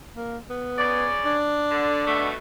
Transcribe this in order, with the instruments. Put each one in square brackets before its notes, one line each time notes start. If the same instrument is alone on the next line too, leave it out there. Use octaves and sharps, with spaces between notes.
[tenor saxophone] A#3
B3
[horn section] C#3 G#4 D5
[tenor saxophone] D4
[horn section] D3
B2 A3